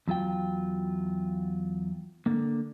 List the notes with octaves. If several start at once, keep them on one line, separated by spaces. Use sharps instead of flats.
E2 F#3 F4 G5
D3 A#3